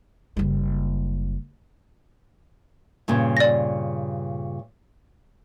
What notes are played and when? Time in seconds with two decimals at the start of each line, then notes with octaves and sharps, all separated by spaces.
0.37 F#1 G3
3.08 G2 A#2 C#3
3.37 D5 A#6